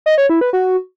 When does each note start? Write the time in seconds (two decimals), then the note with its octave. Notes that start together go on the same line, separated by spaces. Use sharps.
0.06 D#5
0.18 C#5
0.29 E4
0.41 B4
0.53 F#4